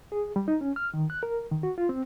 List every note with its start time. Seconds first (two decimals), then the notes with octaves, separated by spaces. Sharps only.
0.12 G#4
0.36 G3
0.48 D#4
0.61 C#4
0.76 F6
0.94 D#3
1.10 F#6
1.23 A#4
1.51 D#3
1.63 F#4
1.78 F4
1.89 C4